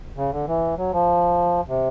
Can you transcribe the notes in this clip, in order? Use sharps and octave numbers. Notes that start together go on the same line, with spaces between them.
C#3
D3
E3
F#3
F3
C3